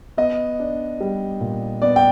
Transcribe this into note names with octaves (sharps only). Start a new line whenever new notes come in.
B3 D#5
D4
G3
A#2
B3 D5
G5